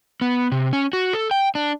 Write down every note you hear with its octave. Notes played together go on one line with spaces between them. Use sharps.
B3
C3
C#4
F#4
A4
G5
D4